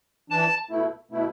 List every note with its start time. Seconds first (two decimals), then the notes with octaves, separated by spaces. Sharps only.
0.30 E3 D4 A5
0.70 B2 A3 E4
1.11 B2 A3 E4